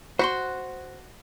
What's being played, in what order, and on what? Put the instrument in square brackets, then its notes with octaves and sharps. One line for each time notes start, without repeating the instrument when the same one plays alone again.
[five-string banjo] F#4 [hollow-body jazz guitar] C5 B5 C6